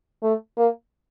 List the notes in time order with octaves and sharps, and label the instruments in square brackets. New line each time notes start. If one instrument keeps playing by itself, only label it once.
[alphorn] A3
A#3